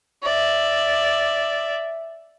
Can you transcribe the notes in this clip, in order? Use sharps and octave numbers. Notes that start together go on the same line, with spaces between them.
D5 E5